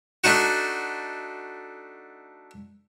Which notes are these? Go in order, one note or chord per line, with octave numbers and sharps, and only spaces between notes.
A3 D4 D#4 F#4